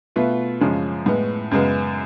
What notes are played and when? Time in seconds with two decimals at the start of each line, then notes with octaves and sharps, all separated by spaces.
0.16 B2 A3 F4 B4
0.61 F#2 C#3 F3 G#3 C#4
1.06 A2 G#3 B3
1.51 F#2 C#3 G#3 B3